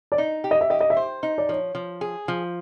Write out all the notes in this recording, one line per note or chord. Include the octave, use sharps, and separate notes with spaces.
D5
D#4
G4
D#5
E5
G4 D#5
D#5
E5
C5
D#4
D5
F3 C#5
F3
G#4
F3